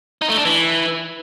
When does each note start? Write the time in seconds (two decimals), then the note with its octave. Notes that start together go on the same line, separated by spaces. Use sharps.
0.22 D#4
0.29 A3
0.37 D4
0.45 E3